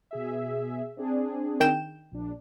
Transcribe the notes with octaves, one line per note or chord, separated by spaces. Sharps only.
B2 G#4 E5
C4 D4 G#4
D#3 G5 E7
A#1 D4